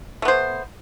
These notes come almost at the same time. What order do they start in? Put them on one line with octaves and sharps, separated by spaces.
A3 B3 C5